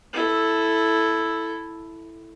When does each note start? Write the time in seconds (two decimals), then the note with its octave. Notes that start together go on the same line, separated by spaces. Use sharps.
0.13 E4 A4